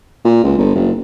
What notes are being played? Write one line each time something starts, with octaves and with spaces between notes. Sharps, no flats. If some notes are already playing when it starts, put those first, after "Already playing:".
A#2
C#2
G1
F#1